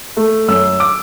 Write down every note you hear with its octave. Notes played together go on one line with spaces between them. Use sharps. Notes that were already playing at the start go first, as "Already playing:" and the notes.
A3
F#2 E6
D6